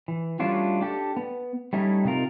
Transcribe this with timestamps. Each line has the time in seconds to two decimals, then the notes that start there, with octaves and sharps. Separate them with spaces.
0.08 E3
0.40 G3 A3 C#4 D4 F4 F#4
0.81 D4 G4 A4
1.17 B3
1.73 G3 A3 C#4 D#4 E4
2.05 C3 D#4 F4 A#4